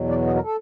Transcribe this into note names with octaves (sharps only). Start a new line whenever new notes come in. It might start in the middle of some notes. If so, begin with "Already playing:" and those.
Already playing: E2 B2 F#3
D5
D#5
A#4
A4